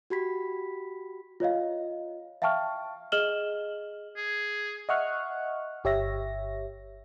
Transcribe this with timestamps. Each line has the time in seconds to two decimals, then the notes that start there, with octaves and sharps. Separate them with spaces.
0.10 F#4 G4 B5 B6
1.40 F4 C#5 D#5 F5
2.42 E5 F5 G5 A5 C#6 F6
3.12 G#4 D#5 F6 E7 F#7 G7
4.16 G#4
4.89 D#5 E5 F#5 C#6 F6 F#6
5.84 G1 G4 C#5 E5 A#6